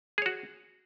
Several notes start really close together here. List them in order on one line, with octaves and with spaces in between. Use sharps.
G#4 C#5 F#4